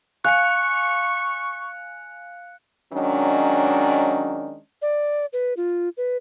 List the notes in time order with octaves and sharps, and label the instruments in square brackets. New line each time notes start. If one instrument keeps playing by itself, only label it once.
[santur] F5 G#5 [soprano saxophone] C#6 [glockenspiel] F#6 C#7
[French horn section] D#3 F#3 G#3 C#4 D4
[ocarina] D5
B4
F4
B4